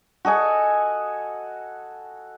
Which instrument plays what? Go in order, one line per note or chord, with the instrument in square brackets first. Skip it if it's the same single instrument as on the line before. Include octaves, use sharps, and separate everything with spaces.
[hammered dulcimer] F#4 A4 D#5 G#5